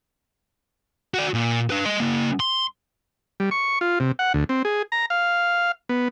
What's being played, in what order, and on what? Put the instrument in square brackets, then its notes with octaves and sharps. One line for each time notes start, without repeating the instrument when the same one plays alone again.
[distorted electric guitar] F#4 D5
A#2
D4 B4
D#5 C6
C#3 A#3
C6
[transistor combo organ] G3
C#6
F4
C3
F#5
D2
C4
G#4
A#5
F5
B3